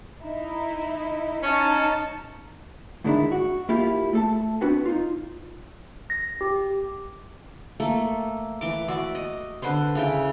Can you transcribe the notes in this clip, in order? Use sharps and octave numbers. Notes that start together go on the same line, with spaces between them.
D#4 E4
C#4 D#4 A5
G#2 D3 D#3 G#3 D4 E4
F#4
A#3 E4 F4 G4
A3 A4 A5
B3 C4 D4 F#4 B4
D#4 F4
A#6
G4
A3 A#3 A4
E3 D6
F#4 D5 E5
D#5
D3 B4 C5 C6
C#3 E4 G5